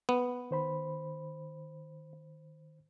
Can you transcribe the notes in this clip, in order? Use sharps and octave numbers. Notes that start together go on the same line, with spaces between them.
B3
D#3 C5 B5